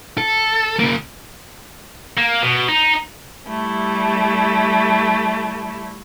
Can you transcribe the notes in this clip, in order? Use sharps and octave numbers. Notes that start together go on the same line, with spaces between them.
A4
C#3 A#3
A#3
B2
D#4
G3 A3 E4